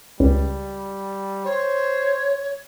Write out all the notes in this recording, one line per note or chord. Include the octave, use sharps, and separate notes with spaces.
C#2 G3
C5 C#5